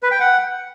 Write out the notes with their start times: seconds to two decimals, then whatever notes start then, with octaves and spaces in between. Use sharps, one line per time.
0.03 B4
0.11 G5
0.20 F#5